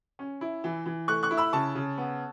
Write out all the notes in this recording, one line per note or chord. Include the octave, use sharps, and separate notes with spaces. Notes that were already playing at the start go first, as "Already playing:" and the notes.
C#4
E4
E3
E3
A3 C#6 F#6
C#6 F#6
E4
B5 E6
C#3 A5 C#6
C#3
B3